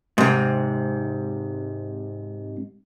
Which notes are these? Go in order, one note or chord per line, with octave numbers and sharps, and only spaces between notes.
G#2 C3